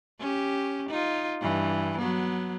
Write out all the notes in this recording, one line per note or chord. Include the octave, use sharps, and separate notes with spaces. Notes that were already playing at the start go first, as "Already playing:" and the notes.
C#4 G4
D#4 F4
G2 E3
F#3 B3